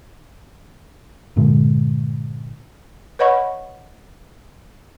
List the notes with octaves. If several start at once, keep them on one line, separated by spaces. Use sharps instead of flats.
G2 A#2 D3 G#3
B4 C#5 D#5 F#5 B5 C#6